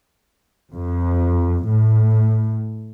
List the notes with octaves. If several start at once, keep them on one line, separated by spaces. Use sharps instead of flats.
F2
A2